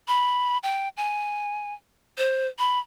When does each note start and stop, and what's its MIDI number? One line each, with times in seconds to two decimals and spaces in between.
0.08 0.58 83
0.63 0.89 79
0.97 1.74 80
2.18 2.47 72
2.59 2.79 83